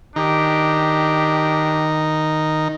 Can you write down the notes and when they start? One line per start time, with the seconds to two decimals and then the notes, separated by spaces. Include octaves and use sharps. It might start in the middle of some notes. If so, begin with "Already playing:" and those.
0.16 D#3 D4 D#4 G4